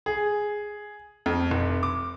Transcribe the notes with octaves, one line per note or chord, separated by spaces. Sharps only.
G#4
F2
F1
D6